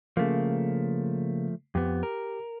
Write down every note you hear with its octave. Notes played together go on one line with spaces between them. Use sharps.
C#3 F3 A3 A#3
F2 B3 G4
A#4